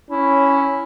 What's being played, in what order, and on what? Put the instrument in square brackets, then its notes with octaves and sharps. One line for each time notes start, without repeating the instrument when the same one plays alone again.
[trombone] C#4 [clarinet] E4